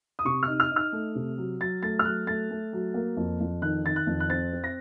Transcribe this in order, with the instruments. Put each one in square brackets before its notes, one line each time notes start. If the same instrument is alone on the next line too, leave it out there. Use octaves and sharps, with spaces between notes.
[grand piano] D#6
C3 C#6
F6
D#4
F6
D#4
F6
A3
C3
F#3
F#3 A6
A3 A6
F6
F#3 F#6
A3 A6
A3
F#3
A#3
F2
F2
D#3 F#6
D#3 A6
F#6
F2
F#6
C4 A6
C4
A#6